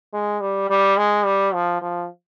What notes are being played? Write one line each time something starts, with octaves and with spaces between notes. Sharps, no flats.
G#3
G3
G3
G#3
G3
F3
F3